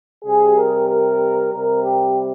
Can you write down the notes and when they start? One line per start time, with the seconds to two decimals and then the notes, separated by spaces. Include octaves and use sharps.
0.24 C3 G3 G#4
0.56 A#4
0.88 A#4
1.53 C3 G3 A#4
1.84 G4